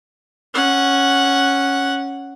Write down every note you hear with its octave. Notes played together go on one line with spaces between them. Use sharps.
C#4 F#5